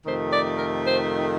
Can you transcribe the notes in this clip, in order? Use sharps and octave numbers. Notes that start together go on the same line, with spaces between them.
F2 C3 D#3 A3 C5
D5
A#4
C5